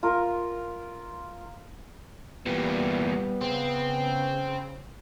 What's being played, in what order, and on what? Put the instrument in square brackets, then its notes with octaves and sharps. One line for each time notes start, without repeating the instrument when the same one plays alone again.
[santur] F4 A#4
[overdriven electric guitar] E2 A#2 [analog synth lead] G3 [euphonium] B3
[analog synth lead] C#3 [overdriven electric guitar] C4